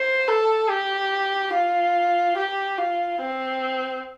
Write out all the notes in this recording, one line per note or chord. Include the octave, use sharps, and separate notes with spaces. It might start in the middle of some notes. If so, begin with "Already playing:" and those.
Already playing: C5
A4
G4
F4
G4
F4
C4